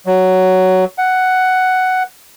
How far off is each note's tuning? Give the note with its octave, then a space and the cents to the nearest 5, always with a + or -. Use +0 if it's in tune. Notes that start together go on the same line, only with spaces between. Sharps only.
F#3 +10
F#5 +5